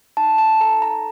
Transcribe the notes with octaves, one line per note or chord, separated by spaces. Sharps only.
D#4 A5
A5
A4 A#5
A#5